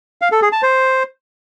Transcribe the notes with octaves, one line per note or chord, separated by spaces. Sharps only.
F5
A4
G#4
A5
C5